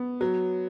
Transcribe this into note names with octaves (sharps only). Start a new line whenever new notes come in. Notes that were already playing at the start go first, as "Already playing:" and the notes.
Already playing: B3
F#3